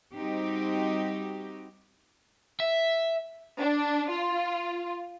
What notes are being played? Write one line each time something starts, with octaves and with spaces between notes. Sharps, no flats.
G3 C4 D#4 F#4 G4
E5
D4
F4